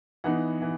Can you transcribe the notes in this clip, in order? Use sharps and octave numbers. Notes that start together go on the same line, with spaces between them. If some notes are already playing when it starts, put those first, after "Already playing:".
E3 B3 D#4 F#5
E3